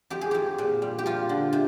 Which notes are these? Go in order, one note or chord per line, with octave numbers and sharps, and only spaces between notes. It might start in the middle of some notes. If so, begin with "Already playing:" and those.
F2 G4
G#4
F2 G4
A#2
G3
G4
F3 F4
D3
C3